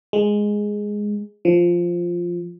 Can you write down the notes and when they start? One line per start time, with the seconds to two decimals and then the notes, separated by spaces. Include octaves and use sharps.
0.13 G#3
1.45 F3